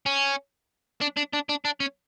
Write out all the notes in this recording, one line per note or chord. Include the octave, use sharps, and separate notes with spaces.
C#4
D4
D4
D4
D4
D4
C#4